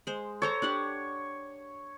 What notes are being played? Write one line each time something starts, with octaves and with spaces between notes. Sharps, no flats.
G#3 C5
A4 C5 C#5 A#5
D4 G4 F#5